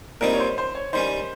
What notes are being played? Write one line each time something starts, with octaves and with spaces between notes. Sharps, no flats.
A#2 G3 C4 D#4 A#4
C#5
C5
C5
C#5
D#3 G3 C#4 C5